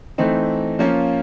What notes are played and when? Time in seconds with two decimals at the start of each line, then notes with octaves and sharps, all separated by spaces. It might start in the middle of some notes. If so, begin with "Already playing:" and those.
0.18 E3 A3 C4 D#4
0.79 F3 A#3 C#4 F4